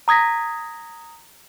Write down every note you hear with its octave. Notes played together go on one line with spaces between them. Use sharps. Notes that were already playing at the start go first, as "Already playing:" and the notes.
A#5 D#6 G#6 A#6 B6